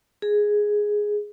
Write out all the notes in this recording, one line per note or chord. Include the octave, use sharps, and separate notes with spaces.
G#4